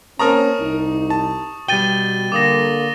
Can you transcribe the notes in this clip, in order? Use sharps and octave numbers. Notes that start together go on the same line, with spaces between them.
A#3 C4 C#4 A#4 A5 A#5 C#6 D#6
C2 D#4
A5
B2 G3 G5 A6 D#7 G7
D3 A#3 D6 D#6 A#6